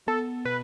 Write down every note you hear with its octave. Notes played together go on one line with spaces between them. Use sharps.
B3 A4
B2 B4